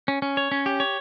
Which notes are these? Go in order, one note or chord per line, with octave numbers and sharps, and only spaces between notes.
C#4
C#4
C#5
C#4
G4
C#5